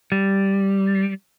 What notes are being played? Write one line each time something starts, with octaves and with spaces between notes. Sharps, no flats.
G3